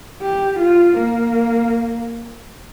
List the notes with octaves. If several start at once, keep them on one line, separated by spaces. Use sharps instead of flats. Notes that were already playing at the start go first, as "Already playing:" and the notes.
G4
F4
A#3